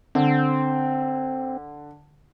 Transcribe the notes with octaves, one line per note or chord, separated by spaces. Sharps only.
D3 C4